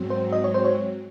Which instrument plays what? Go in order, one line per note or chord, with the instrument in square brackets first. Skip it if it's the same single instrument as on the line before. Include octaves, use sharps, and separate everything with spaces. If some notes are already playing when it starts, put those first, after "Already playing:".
Already playing: [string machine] G#2 F#3 C4
[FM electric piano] C5
D#5
C#5
C5
C#5